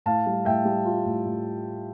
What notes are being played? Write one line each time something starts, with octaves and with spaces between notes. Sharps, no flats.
A2 F5 A5
G3
A2 E5 G5
G3
F4
A2
A2